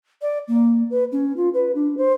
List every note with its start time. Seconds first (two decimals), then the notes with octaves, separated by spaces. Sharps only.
0.22 D5
0.48 A#3
0.90 B4
1.12 C#4
1.37 F4
1.53 B4
1.75 D4
1.97 C5